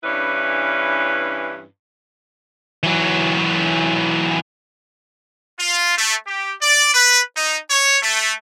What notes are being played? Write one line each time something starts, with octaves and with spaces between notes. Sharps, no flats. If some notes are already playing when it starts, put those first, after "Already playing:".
G2 E3 C#4 D4 E4 B4
E3 F#3
F4
A3
G4
D5
B4
D#4
C#5
A3